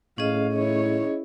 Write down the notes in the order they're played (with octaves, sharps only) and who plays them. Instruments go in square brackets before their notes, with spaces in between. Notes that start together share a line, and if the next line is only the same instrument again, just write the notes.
[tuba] A2 [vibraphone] C#4 G#4 D#5 [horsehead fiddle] F5
[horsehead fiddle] E4 C#5